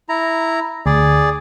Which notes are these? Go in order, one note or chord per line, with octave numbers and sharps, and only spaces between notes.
E4 A#5
D2 G#4 D5